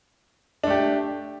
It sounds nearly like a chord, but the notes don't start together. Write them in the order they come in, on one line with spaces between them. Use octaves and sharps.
D4 A3 G4